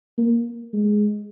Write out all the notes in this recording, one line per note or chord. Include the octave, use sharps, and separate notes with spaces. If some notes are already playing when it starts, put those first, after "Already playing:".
A#3
G#3